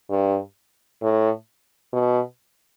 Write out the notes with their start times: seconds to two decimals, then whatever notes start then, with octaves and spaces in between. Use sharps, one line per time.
0.10 G2
1.02 A2
1.93 B2